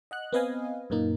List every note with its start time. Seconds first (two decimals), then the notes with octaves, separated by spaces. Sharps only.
0.11 D#5 F#5 F#6
0.33 B3 C4 B4 D#5 F5 G#5
0.90 F#2 A#2 A#3 D#4